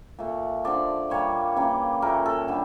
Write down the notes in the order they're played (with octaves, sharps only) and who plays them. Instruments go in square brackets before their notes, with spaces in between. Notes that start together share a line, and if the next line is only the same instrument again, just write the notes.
[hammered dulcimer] A#2 A3
D3 F3 A3 D5
A#2 G3 A#3 C#5
C#3 E3 G3 A#3
A#2 A3 A#4
A4
D3 G3